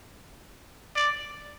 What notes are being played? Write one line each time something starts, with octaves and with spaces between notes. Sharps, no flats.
D5